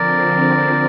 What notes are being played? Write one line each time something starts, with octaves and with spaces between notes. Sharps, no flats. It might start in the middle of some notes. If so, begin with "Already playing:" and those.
Already playing: D3 F3 C4 A#4 D5